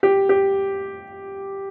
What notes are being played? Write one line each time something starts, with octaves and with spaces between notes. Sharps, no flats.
G4
G4